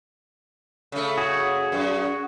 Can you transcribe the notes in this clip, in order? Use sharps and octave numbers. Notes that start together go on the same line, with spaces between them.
C#3 A3
F#4 G#4
F#2